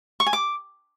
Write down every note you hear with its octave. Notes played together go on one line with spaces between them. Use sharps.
C#6
G#5
D6